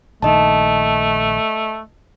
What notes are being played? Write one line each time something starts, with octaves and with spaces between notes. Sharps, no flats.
A#1 D#3 A3 D#5 A5